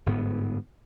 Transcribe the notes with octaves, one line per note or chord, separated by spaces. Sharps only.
G1 G#2 B3